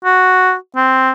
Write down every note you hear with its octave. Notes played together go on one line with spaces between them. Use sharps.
F#4
C4